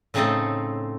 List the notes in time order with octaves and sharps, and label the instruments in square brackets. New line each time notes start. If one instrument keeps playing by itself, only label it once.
[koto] A2 C#3 A3 C4 D#4 A4